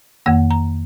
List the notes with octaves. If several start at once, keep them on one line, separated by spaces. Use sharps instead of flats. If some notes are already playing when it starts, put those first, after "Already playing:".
F2 D#3 A#3 F#5
A#5